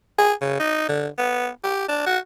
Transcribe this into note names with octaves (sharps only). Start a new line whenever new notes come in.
G#4
C#3
D#4
D3
B3
G4
D4
F#4